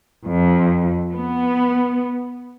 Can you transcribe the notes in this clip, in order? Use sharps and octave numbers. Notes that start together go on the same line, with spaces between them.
F2
B3